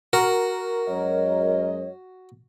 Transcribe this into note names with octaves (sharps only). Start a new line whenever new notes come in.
F#4 A#4
F#2 G#3 C#5 D#5